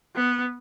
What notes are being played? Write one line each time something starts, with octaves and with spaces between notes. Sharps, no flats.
B3